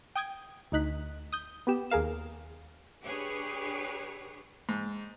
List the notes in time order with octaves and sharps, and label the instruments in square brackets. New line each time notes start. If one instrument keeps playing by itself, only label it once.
[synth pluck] G5 D#6 G6 G#6
D2 D#4 F#6 B6
D#6 G6
B3 G4 E7
D#2 G#4 A#4 F5 E7
[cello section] D4 G4 G#4 B4 C#5
[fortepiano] G#2